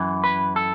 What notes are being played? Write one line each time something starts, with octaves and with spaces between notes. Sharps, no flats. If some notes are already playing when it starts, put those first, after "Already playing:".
Already playing: F#2 E3
B4
A4